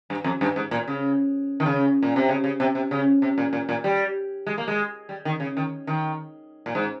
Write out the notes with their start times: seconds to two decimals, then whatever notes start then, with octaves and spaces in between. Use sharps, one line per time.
0.10 G2
0.24 F2
0.41 G2
0.56 G#2
0.71 A#2
0.87 C#3
1.60 D#3
1.66 C#3
2.03 A#2
2.16 C3
2.29 C#3
2.44 C#3
2.60 C3
2.75 C3
2.91 C#3
3.22 C3
3.38 A#2
3.53 A#2
3.69 A#2
3.84 G3
4.47 G#3
4.58 A#3
4.68 G#3
5.09 G3
5.25 D#3
5.40 C#3
5.57 D#3
5.87 D#3
6.66 A#2
6.75 G#2